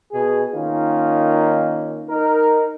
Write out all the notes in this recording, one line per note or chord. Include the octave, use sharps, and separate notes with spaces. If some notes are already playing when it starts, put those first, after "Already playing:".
B2 G#4
D#3 A#3 C#4 D#4 F4
D#4 A#4